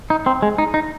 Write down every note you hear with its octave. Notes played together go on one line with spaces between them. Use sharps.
D#4
C4
G#3
D#4
D#4